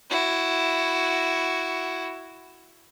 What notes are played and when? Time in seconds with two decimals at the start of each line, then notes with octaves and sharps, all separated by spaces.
0.10 E4 F#4